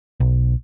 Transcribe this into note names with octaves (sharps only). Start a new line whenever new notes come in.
B1